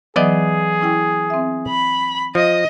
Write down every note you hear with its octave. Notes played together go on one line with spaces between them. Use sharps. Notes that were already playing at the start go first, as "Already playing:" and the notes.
E3 F#3 B3 G#4 D5 D#5
C#4 E4 G5
C4 E5
B5
F3 D#5 D#6 A#6